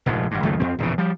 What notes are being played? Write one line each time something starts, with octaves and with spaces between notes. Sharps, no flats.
F1 A#1 G#2 F3
G#1 G2
C#2 F#2 D#3 A3
F2 C4
A#1 E2 A2 C#3
F3 G3